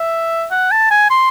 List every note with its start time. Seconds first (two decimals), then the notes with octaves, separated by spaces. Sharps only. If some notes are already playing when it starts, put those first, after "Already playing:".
Already playing: E5
0.51 F#5
0.72 A5
0.91 G#5
1.10 C6